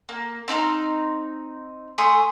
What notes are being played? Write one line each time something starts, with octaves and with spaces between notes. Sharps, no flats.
A#3
C4 D#4 A#5 F6
A3 G#5 C6 D#6